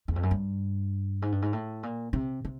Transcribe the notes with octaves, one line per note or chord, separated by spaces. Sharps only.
E2
F2
F#2
G2
G#2
G2
G#2
A2
A#2
C3
C3